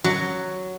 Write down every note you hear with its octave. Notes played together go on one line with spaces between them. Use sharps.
F#3